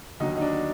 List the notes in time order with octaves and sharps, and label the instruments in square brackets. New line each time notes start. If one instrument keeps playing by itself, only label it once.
[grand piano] D#2 D3 F#3 D#4
D#4
D4